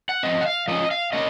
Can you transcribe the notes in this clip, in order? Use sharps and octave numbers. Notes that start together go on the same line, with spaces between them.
F#5
F3 G#3 C4 D#5
F#5
F5
F3 A#3 C#4 D#5
F5
A#3 C#4 D#5